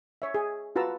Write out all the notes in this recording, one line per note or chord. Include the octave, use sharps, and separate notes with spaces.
C#5 E5
G#4
F4 F#4 B4 A5 A#5 E6